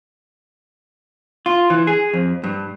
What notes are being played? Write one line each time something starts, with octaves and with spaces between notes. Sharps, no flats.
F4
E3
G#4
F2
G2